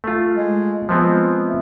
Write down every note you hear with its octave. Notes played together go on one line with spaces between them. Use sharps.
A3 F4
G#3
F3 G#3 B3 C4
A3